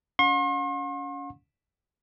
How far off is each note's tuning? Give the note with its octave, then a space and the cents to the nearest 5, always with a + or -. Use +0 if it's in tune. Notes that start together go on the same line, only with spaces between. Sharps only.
C#4 +30 F#5 -45 C6 +45